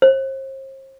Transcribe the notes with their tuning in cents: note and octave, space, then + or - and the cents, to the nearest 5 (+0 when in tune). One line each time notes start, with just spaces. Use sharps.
C5 +40